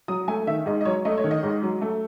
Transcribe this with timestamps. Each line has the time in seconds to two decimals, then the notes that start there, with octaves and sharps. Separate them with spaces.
0.08 F#3 D#6
0.28 A3 G#5
0.47 D#3 E5
0.66 G#2 D#5
0.81 D#5
0.85 F#3 C#5
1.05 A3 D#5
1.18 C#5
1.24 D#3
1.31 D#5
1.43 G#2
1.63 F#3
1.82 A3